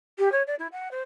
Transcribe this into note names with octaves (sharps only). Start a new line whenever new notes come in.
G4
C#5
D5
E4
F#5
C5